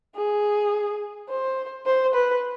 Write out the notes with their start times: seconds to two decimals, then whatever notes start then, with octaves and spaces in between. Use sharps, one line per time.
0.15 G#4
1.29 C5
1.86 C5
2.14 B4